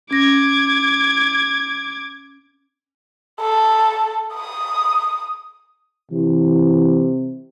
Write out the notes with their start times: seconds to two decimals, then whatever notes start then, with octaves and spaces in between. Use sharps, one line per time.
0.11 C#4 D6 G#6 A#6
3.40 A4
4.34 D#6
6.11 C3 E3